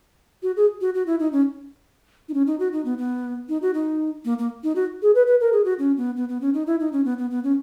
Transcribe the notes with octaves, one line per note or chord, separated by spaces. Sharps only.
F#4
G#4
F#4
F#4
E4
D#4
C#4
D#4
C#4
D#4
F#4
D#4
B3
B3
D#4
F#4
D#4
A#3
A#3
D#4
F#4
G#4
B4
B4
A#4
G#4
F#4
C#4
B3
B3
B3
C#4
D#4
E4
D#4
C#4
B3
B3
B3
C#4